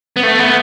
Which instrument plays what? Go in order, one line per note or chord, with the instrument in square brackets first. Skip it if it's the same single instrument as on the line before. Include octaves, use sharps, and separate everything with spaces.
[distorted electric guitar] B3
A3
B3